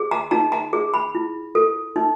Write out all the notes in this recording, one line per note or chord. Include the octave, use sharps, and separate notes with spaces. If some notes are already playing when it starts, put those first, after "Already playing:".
Already playing: G#4
A#5
D#4 A#5
A#5
G#4
B5
E4
A4
D#4